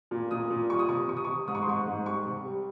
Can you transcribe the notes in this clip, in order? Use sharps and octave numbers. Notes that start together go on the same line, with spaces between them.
A#2
A#2 D#6
A#2
G3 C#6
D#6
C3 C#6
C3 C#6
D#6
C#6
C3
G#2 D#6
C#6
C6
G#2 C#6
G#2
G3 C#6
C3
G3